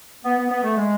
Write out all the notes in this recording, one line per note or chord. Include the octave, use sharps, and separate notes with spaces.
B3
B3
B3
A3
G#3